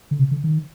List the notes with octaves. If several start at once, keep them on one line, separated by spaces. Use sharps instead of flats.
D3
C3
D3
D#3